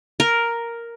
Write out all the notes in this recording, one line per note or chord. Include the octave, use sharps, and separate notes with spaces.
A#4